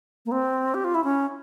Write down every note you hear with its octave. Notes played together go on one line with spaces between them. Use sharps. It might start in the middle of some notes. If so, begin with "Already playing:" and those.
A#3
C4
G4
F4
E4
C#4